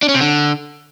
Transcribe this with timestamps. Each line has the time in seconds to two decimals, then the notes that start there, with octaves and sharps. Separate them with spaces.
0.03 D4
0.08 C#4
0.14 C3
0.20 D3